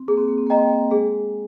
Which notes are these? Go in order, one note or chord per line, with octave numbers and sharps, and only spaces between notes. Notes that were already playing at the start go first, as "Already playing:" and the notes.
Already playing: C4
A#3 G#4
C4
A#3
C4
A#3 D#5 G5 A#5
C4
A#3
G#3 G#4